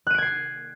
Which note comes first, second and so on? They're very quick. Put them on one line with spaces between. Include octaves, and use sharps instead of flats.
F#6 D#7 D7 G#6 C7